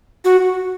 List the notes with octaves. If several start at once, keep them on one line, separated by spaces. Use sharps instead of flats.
F#4